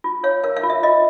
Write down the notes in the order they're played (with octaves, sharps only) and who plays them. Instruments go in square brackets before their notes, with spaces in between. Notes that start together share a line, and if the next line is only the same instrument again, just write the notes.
[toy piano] F4
C#5 F5
A#4 F5
F5
F4
E5
F4 D#5